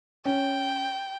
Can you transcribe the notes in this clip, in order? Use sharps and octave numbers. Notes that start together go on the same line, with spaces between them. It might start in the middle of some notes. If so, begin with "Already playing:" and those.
C#4 G5